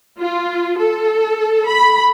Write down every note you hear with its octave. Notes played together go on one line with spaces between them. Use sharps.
F4
A4
B5